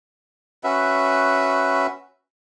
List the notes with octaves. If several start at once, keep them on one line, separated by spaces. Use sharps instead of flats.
C#4 F#4 B4 E5